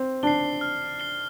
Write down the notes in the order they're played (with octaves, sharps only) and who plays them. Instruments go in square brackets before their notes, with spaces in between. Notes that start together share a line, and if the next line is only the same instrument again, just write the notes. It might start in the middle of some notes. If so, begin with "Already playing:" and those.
Already playing: [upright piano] C4
[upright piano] D4 [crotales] C7 G7
[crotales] F6
C7 G7